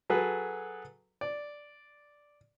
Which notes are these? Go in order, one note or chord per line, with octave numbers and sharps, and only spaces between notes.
F#3 G#4 A4 B4
D5